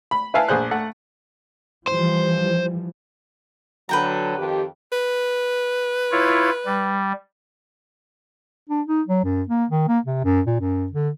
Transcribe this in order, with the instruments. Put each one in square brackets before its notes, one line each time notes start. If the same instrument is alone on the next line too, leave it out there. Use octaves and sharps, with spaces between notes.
[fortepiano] B5
E4 B4 E5 F5 G#5 A5
A#1 G#4 C5 F#6
A3 F#5
[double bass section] E3 F3 G3 [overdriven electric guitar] C5
[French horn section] D3 F#3 [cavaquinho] B4 G5 A#5
[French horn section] F2 D#3 G4
[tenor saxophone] B4
[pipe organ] E4 F4 C#5
G3
[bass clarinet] D4
D#4
F#3
F#2
A#3
D#3
A#3
C3
F#2
A#2
F#2
D3